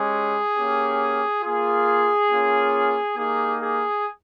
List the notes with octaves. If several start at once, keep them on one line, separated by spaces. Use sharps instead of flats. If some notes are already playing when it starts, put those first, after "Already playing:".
Already playing: G#3 C#4 G4 G#4
A#3 C#4 G4
A#3 F4 G#4
A#3 C#4 F4
A#3 D#4 G4 G#4
G#4